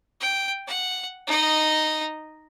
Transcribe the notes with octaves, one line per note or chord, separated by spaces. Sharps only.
G5
F#5
D#4 D#5